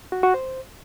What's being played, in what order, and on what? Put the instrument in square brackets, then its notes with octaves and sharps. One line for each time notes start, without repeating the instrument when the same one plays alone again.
[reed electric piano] F#4
F#4
C5